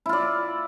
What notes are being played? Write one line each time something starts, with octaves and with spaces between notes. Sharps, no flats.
E4 F4 D5